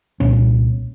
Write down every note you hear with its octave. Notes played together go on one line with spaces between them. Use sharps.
C2 A#2 C#4